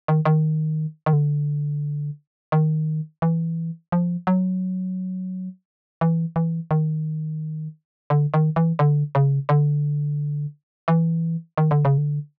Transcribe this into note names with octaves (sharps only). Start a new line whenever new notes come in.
D#3
D#3
D#3
D3
D#3
E3
F3
F#3
E3
E3
D#3
D3
D#3
E3
D3
C#3
D3
E3
D#3
D3
C#3
D3